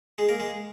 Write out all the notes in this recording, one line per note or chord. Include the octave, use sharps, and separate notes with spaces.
G#3 G#4
A#3 A#4
G#3 G#4